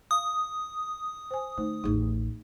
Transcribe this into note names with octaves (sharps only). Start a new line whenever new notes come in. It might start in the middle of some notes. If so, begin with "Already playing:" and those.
F5 D#6
C5 G#5
D3 A3 D#4 C5
A1 D#2 D#4 G#4